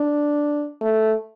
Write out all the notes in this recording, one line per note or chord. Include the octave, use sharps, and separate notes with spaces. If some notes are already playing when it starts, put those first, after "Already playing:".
Already playing: D4
A3